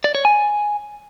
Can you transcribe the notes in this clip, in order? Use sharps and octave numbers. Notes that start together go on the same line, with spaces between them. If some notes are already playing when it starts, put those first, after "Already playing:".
D5
C#5
G#5